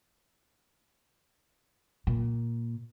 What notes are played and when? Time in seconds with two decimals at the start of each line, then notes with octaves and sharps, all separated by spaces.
2.07 A#2